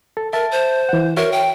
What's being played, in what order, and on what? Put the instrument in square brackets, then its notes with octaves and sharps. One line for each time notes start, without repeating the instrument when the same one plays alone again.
[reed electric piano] A4
[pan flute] A#4 [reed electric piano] E5 A5
[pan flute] C5
[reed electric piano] E3 F#5
[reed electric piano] F#4 C#5 E5 [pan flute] A#4
[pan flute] G5